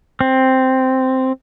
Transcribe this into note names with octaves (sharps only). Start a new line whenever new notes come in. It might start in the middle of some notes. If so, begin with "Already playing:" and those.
C4